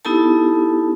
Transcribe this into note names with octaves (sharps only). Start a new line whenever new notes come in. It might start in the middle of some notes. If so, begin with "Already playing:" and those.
B3 D#4 E4 G4 A4 A5